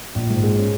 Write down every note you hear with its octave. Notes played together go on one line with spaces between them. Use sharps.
A#1
G#2
G#3
C#4